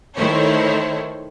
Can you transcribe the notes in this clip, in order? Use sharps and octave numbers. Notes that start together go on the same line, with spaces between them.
D#3 A3 E4 C5 C#5